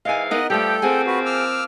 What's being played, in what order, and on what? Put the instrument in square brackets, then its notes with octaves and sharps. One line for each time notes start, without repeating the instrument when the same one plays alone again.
[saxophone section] G#2 E3 F5 [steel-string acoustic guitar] D#5 G#5
[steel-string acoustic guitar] B3 D#4 A#4 [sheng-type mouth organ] D#5 F#5
[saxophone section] F3 B3 G4 [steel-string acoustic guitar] G3 A3 [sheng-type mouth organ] A4 G5
[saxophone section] F3 A#3 C4 [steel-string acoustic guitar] G#4 F#5 G#5
[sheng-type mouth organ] F#4 B4
D6 E6 F6